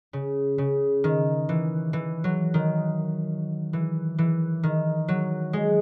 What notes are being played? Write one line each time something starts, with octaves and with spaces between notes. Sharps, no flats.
C#3
C#3
D#3
E3
E3
F#3
D#3
E3
E3
D#3
F#3
G#3